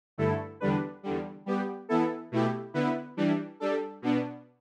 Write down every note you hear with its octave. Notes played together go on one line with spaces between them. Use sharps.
G2 D3 A3 E4 A4
E2 D3 G3 D4 B4
E2 D3 G3
G3 B3 G4
E3 B3 E4 A4
B2 A3 E4 G4
D3 B3 E4 B4
E3 G3 D4
G3 D4 A4
B2 B3 D4